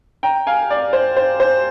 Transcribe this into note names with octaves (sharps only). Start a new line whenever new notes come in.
G5 A#5
F5 G#5
D5
C5
C5
C5